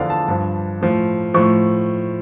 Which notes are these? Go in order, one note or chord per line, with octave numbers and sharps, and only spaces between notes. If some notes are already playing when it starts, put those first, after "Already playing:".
Already playing: E2 D3 F3 D5 F5
A5
G2 F3
A2 F3
A2 F3 C#6